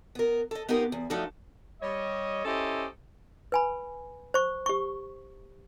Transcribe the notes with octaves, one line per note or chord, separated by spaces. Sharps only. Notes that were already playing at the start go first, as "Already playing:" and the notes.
B3 A#4
A4 D#5
B3 D#4 F4 G4 A#4
E2
F3 F#3 A3 D4 D#4 F#4
G3 C#5 D#5
C#4 E4 G4 A4 C5 D#5
B4 G#5 B5
C5 C#6
G4 C#6